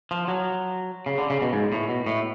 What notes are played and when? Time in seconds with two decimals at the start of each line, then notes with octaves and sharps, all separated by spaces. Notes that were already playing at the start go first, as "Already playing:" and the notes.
0.11 F3
0.28 F#3
1.06 C#3
1.18 D3
1.30 C#3
1.42 B2
1.53 G#2
1.72 A2
1.89 B2
2.06 A2